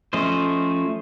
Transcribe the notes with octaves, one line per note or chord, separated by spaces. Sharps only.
F3 A3 C#4 C5 D#5